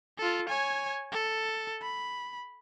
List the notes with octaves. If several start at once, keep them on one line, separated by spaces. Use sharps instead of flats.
F4 A4
C#5 G#5
A4
B5